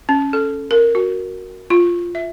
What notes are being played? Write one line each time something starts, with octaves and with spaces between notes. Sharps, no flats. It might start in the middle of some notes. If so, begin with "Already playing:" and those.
C#4
A4
A#4
F#4
F4
E5